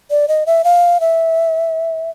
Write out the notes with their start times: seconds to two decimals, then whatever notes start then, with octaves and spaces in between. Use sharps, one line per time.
0.10 D5
0.28 D#5
0.46 E5
0.64 F5
1.00 E5